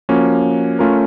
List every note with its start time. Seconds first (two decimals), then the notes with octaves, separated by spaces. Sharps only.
0.09 F3 A#3 C#4 F#4
0.79 A3 C#4 F4 A#4